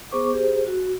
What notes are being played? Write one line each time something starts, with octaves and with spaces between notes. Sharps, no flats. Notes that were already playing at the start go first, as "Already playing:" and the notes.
B3 G#4 C5 C#6 D6
G4 G#4 C5
F#4